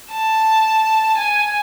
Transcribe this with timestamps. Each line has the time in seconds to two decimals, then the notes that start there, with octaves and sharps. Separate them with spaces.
0.12 A5
1.18 G#5